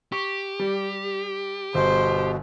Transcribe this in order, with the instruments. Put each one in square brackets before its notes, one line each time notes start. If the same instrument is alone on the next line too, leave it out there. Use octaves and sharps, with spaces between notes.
[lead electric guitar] G4 [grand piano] C#6
[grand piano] G3
[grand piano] G1 [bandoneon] B2 [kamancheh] C5